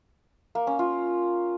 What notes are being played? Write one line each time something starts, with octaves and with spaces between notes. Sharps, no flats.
A#3
C#4
F4